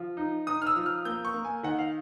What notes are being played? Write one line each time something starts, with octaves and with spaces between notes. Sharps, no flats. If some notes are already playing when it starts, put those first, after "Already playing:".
Already playing: F3
D#4
D#4 D#6
F6
E6
F3
F6
A#3 G6
C#6
A#3
G#5
D#3 F#5
F5